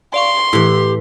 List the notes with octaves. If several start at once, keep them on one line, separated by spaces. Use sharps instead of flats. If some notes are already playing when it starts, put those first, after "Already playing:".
D5 F5 C6 C#6
A2 E3 E4 G4